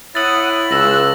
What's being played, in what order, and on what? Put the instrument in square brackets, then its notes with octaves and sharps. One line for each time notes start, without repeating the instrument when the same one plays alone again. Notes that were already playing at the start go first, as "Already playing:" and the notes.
[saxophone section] E4 C#5 [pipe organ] F#5 D#6 [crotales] A6 F#7
[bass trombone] C#2 [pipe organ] E6 F#6 [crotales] A#6 F#7